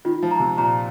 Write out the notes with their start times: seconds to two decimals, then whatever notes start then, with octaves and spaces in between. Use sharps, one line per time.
0.05 D#3 F4
0.23 F3
0.31 A#5
0.40 C3
0.58 A#2 A#5